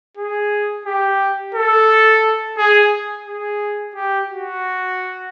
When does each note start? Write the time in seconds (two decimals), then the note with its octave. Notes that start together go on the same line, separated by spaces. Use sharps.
0.17 G#4
0.86 G4
1.55 A4
2.58 G#4
3.26 G#4
3.95 G4
4.30 F#4